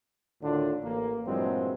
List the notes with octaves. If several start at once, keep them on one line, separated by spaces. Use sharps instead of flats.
D2 A2 D3 D#3 D4 F4
A1 A#3
G2 A#2 E3 F#3 G#3 C4